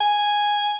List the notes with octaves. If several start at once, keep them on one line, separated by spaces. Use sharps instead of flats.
G#5